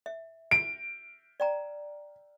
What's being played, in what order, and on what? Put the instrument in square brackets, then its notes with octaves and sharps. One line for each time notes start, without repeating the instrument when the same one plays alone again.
[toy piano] E5
[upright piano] D7
[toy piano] D5 G5 A#5